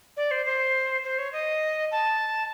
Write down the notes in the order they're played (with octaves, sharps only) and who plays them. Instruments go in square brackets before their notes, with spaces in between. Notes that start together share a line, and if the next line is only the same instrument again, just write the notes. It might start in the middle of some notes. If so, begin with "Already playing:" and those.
[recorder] D5
C5
C5
C5
C#5
D#5
A5